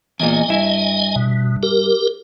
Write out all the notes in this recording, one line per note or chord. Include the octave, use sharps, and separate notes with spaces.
E2 A#2 D#5 G#5
G2 E4
B2
G4 A#4